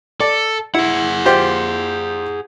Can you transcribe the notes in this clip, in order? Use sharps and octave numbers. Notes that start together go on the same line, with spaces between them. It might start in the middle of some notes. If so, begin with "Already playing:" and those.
A4 D5
E4 G#4 F#5
F4 G4 C5